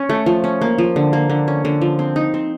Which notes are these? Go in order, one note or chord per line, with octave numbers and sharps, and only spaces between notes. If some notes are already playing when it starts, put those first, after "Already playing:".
Already playing: C#4
A3
F3
C#4
A#3
F3
D3
A#3
D3
C#4
D3
F3
C4
D#4
C4